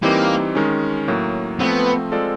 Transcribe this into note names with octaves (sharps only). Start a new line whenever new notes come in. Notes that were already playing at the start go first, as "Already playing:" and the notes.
E3 G3 A#3 C4 D#4 G4
D#3 G#3 C#4
A2 F#3 A#3
F3 A3 B3 C4
G#3 C4 F4 A4 D5